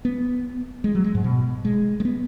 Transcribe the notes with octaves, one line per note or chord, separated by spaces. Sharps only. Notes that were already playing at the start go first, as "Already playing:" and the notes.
B3
G#3
F#3
G#3
G#2
B2
G#3
G#3
B3